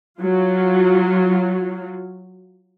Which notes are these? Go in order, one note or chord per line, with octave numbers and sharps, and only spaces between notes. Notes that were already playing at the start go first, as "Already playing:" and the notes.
F#3 F4